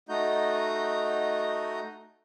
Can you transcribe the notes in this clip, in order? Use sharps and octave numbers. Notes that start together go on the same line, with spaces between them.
A3 D#4 F#4 D#5 A#5 G6